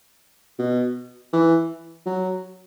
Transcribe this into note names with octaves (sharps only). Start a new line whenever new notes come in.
B2
E3
F#3